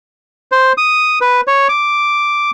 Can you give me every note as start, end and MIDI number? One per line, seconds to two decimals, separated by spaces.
0.52 0.73 72
0.78 1.19 87
1.21 1.41 71
1.47 1.68 73
1.69 2.51 86